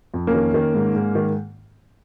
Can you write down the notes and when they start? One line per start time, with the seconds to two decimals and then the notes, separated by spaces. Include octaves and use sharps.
0.14 F2
0.27 A#3 C#4
0.34 D#3
0.54 D#3
0.74 G#2
0.94 G#2
1.15 D#3